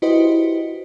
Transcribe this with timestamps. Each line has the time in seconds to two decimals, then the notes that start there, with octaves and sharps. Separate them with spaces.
0.02 E4 F#4 G4 B4 C5 D#5